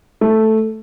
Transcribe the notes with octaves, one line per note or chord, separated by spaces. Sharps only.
A3